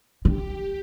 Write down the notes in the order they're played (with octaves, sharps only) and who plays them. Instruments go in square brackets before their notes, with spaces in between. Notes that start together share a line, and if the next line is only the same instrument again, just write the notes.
[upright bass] D3 [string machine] G4